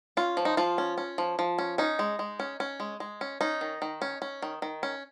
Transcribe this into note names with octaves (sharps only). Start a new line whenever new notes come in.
C#4 F4
F3
D#4
F3 F4
C#4
C#4
F3
F3
C#4
C#4 D#4
G#3
G#3
C#4
C#4
G#3
G#3
C#4
C#4 D#4
D#3
D#3
C#4
C#4
D#3
D#3
C#4